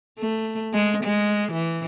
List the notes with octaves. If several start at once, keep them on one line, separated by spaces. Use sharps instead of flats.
A3
G#3
G#3
E3